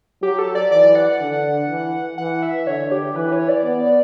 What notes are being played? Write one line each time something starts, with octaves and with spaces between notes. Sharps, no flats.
F#3 G4
A4
D5
E3 D5
F#5
D3
E3
E3 F#5
E5
D3 C#5
G4
E3 B4
C#5
D5
B3